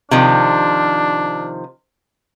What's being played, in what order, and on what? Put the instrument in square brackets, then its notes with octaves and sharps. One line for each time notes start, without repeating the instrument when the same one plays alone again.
[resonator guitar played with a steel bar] C3 D#3 F3 [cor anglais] D4